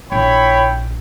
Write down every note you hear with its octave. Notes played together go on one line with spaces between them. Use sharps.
A#1 E4 C#5 G5 B5